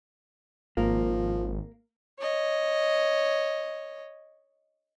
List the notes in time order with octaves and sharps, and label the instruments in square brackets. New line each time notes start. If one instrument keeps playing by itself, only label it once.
[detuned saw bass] G#1 [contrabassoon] F3 [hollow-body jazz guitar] A#3
[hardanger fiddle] C#5 D#5